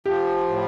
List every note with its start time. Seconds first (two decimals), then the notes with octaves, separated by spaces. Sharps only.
0.06 F3 G4
0.49 A2